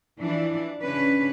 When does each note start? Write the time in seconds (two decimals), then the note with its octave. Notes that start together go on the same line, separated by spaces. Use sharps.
0.19 E3 F3 D4 E4
0.82 C#3 C#4 D4 B4